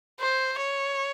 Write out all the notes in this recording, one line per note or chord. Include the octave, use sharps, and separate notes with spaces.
C5
C#5